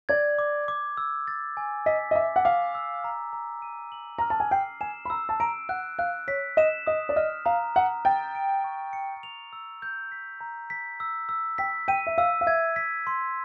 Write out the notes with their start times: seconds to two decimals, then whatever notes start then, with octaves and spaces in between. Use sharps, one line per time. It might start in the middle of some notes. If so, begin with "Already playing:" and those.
0.09 D5 G#6
0.39 D6
0.68 D6
0.97 E6
1.28 A6
1.57 G#5
1.86 D#5 B6
2.11 D#5
2.15 E5 D6
2.36 F#5
2.45 F5 D6
2.75 E6
3.04 A#5
3.33 A#5
3.62 D#7
3.92 F#7
4.19 A#5 F6
4.30 A5
4.40 G#5
4.51 G5 C7
4.81 G#5 E7
5.05 B5
5.10 A#5 E6
5.29 A5
5.40 A#5 D7
5.69 F#5 F#6
5.99 F5 F#6
6.28 C#5 B6
6.57 D#5 E7
6.87 D#5 D#6
7.09 D5
7.16 D#5 F6
7.45 F5 A#5
7.75 F#5 A#5
8.05 G5 A6
8.35 D7
8.64 C#6
8.93 C#7
9.23 F7
9.53 E6
9.82 G6
10.12 B6
10.41 A#5
10.70 B6
11.00 E6
11.29 E6
11.58 G5 B6
11.88 G5 D#7
12.07 E5
12.18 F5 E6
12.41 F5
12.47 E5 G#6
12.76 B6
13.07 C6